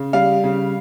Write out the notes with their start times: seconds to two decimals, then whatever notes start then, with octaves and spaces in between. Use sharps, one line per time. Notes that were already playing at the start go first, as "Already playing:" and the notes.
Already playing: C#3
0.13 G3 F5
0.44 C#3